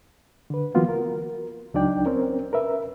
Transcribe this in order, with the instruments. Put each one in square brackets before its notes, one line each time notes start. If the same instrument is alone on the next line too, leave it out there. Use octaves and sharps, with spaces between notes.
[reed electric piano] D3 B4
E3 F#3 A#3 B3 F4 F#4
A#4
C#2 F#3 D4 D#4 D5 G5
C4 C#4 A#4
A#4 B4 E5